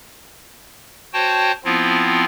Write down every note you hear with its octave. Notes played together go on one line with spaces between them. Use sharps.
F#4 C5 C#5 G5 A5
F3 B3 C4 E4 F4